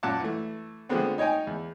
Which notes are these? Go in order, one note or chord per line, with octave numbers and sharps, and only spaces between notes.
F#2 A#2 F#5 A5 D6
E3 A3
D3 F3 G#3 A3 B3 C4
D#4 C#5 D#5 G5 G#5
E2